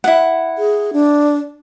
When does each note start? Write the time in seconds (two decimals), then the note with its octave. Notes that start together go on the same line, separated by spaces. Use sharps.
0.04 E4 F4 F#5
0.58 G#4
0.93 D4